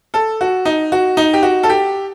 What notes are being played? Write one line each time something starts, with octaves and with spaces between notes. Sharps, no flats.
A4
F#4
D#4
F#4
D#4
G4
F#4
A4
G4